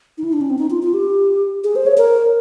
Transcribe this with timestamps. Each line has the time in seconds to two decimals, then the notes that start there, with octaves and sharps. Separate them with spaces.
0.18 D#4
0.24 E4
0.33 D4
0.41 C#4
0.50 C4
0.59 D#4
0.70 F4
0.83 F4
0.94 G4
1.64 G#4
1.76 C5
1.86 C#5
1.98 A#4